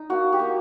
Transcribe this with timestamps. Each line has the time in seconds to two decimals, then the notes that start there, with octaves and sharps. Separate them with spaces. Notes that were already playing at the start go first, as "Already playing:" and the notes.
Already playing: D#4
0.09 A#3 F#4
0.32 G4
0.39 A#3